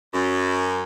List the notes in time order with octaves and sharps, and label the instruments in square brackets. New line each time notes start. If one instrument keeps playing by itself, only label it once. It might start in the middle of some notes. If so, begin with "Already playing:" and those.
[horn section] F#2